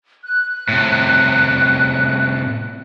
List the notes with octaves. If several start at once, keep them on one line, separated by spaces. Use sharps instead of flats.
F#6
A2 C3